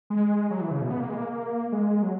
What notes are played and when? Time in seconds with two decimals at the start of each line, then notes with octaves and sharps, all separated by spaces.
0.10 G#3
0.51 F#3
0.61 E3
0.71 C#3
0.81 B2
0.90 B3
1.00 A#3
1.09 G#3
1.18 A#3
1.72 G#3
2.03 F#3